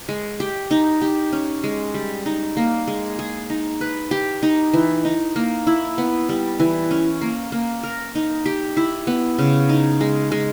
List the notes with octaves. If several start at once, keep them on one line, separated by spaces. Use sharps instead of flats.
G#3
G4
D#4
G4
C#4
G#3
G3
D#4
A#3
G#3
G#4
D#4
B4
G4
D#4
E3
D#4
A#3
E4
B3
G3
E3
C#4
A#3
A#3
A#4
D#4
G4
E4
B3
C#3
D#4
G#3
G#3